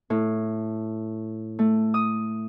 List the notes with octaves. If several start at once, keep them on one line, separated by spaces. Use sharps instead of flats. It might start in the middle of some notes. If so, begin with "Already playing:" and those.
A2
A3
D#6